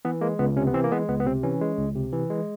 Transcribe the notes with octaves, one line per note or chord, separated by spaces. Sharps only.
E3 B3
G#3 A#3
C#2 B3
C3 C#4
B3
E3 C4
A#3
G#3 B3
C#2 B3
B3
C3 C4
E3 C#4
G#3
C#2
C3
E3
G#3